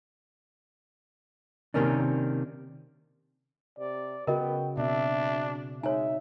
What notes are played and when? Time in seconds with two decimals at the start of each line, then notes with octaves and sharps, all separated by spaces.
1.74 C3 D#3 A#3 C#4 D4
3.79 C3 D5
4.27 C#3 B3 F#4 A#4 D#5 G5
4.77 B2 C4 D4 E5
5.83 G#3 D#4 C#5 E5 G#5